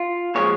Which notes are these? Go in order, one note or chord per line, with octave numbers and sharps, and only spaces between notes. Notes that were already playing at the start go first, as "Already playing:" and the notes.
Already playing: F4
A#2 F3 G#3 C#5